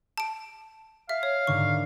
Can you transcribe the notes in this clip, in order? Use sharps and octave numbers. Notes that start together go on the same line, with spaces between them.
A5 D7
E5 F5
C#5
G#2 D3 D#3 C#6